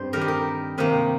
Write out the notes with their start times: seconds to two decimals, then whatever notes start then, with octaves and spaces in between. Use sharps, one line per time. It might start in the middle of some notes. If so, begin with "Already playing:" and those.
Already playing: G2 C4 C5
0.13 D#3 G3 D#4 A#4
0.21 G4
0.28 A#4
0.78 C3 D#3 A#3